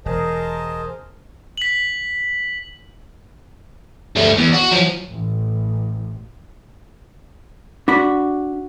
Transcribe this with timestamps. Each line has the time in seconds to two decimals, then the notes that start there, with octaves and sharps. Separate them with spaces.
0.06 E1 E2 G#4 A#4 C5 D#5 A5
1.58 B6 F#7
4.16 G2 A3
4.37 E2
4.53 F#4
4.71 F3 F#3
5.12 A1
7.88 D4 F#4 B5